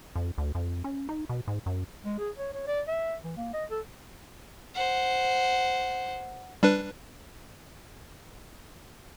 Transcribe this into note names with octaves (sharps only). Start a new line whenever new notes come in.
F2
D2
F2
C#4
D#4
B2
G#2
F#2
G#3
G#4
C#5
C#5
D5
E5
E3
A#3
D#5
A4
C5 F#5
G3 D4 B4